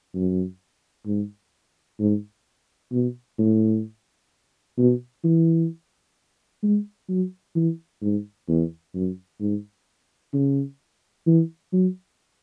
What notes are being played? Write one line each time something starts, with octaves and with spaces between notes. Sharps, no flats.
F#2
G#2
G#2
B2
A2
B2
E3
G#3
F#3
E3
G#2
E2
F#2
G#2
C#3
E3
F#3